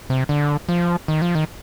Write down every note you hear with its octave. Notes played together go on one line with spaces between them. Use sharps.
C3
D3
F3
D#3
F3
D#3